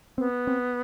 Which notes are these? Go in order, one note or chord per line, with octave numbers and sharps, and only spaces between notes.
B3 C4
C4